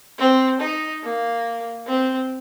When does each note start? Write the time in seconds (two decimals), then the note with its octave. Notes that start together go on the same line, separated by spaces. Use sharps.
0.18 C4
0.60 D#4
1.03 A#3
1.86 C4